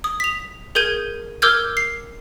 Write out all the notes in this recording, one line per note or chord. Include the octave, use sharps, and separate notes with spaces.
D#6
B6 F7
G#4 A#4 G6 G#6 D#7
A#4 D6 E6 F6 G6 G#6
C7